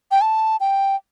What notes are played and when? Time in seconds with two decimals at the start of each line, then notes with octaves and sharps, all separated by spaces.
0.11 G5
0.21 A5
0.60 G5